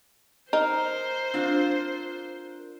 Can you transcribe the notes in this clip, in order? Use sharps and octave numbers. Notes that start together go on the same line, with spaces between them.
D#4 A#4 C5
C4 D4 F4